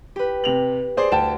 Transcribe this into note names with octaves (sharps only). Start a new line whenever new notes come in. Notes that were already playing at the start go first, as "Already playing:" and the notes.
G4 B4
C3 F7 F#7
G#4 C5 D5
D2 G5 A5 E7